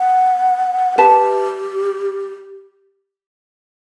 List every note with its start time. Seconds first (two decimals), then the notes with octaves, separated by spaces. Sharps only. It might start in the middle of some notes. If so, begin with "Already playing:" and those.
Already playing: F#5
0.98 G4 B4 E5 A5